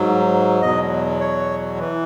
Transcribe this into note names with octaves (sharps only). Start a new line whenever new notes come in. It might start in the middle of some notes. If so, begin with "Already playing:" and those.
Already playing: G#2 F#3
E2 B2 F#3 D#5
C#5
E3